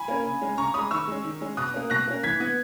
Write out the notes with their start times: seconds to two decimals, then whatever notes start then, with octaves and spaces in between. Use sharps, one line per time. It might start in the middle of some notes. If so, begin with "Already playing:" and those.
Already playing: G#5 B5
0.08 A#3 C#4
0.25 C#3
0.41 G#3 C#4
0.58 C#3 A#5 C#6
0.74 G#3 C#4 B5 D#6
0.91 D#3 C#6 E6
1.07 G#3 C#4
1.24 D#3
1.41 G#3 C#4
1.57 B2 D#6 F#6
1.74 A#3 C#4
1.90 B2 F#6 A#6
2.07 A#3 C#4
2.23 E3 G#6 B6
2.40 B3